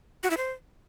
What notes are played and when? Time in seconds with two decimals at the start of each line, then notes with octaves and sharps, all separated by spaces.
0.23 F#4
0.30 E4
0.37 C5